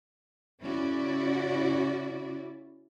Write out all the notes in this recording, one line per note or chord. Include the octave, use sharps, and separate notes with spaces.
C#3 C#4 E4 F#4 D5